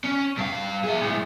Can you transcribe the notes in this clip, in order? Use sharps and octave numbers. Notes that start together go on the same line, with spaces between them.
C#4
G2 F5
G#4 E5
A2 G#3